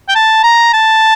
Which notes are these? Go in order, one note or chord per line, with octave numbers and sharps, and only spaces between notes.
G5
A5
A#5
A5